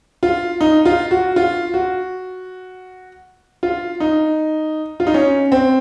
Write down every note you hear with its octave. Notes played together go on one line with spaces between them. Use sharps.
F4
D#4
F4
F#4
F4
F#4
F4
D#4
F4
D#4
C#4
C4